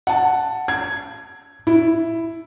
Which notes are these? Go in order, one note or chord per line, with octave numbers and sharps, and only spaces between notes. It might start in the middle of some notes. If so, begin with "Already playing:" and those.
F#5 A5
G#6
E4